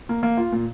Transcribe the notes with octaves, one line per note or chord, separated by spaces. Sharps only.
A#3
A#3
F4
A#2